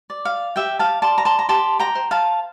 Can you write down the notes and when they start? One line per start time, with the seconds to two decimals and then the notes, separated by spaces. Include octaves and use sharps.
0.10 D5
0.25 F5
0.56 G4 E5 G5
0.79 F5 A5
1.02 D5 A5 C6
1.18 A#5
1.25 A5 C6
1.39 A#5
1.49 G4 A5 C6
1.79 G5 A#5
1.95 C5
2.11 F5 A5